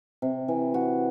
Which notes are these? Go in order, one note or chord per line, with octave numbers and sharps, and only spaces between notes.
C3
E3
F#4